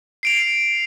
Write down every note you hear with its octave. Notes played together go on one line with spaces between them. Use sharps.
C7 D7 F7